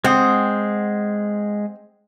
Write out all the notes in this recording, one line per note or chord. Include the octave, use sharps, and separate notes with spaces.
G#3 C4 F#5 D#6